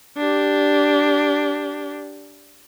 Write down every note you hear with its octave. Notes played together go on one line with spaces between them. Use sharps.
D4 G4